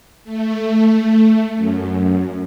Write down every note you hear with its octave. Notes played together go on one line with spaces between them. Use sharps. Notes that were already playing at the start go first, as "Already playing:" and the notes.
A3
F#2